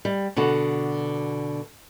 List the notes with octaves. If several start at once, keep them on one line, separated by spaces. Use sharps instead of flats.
G3
B2 D3 B3 F#4